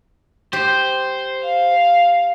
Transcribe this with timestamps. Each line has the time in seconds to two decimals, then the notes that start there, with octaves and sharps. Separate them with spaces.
0.53 G4 C5
1.44 F5